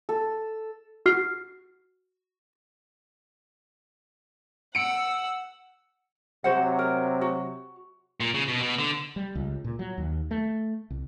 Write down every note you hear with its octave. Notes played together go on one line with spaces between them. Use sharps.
A4
F#4 F6 C7
F#5 E6 C#7 D7
C3 F#3 F#4 C5 F#5
A#4
F#4
A#2
C#3
B2
B2
D3
G3
C#2
A#2
F#3
D#2
A3
C2